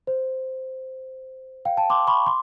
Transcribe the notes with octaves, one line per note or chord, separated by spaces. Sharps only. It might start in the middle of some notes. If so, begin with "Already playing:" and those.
C5
F5 G5
G5 A5
C6 D6
B5 C#6
C6 D6